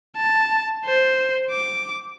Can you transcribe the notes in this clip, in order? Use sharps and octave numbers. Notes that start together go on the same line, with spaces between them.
A5
C5
D6